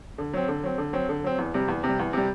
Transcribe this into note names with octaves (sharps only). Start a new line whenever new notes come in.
D3
F#3 C4
D3
F#3 C4
D3
F#3 C4
D3
F#3 C4
E2
C3 G3
E2
C3
G3
E2
C3 G3